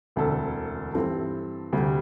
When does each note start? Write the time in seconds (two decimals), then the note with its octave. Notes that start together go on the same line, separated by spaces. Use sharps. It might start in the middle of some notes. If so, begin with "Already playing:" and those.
0.16 E1 D2 D3 C4 A4
0.94 G2 E3 C4 A4
1.73 D2 C3 G3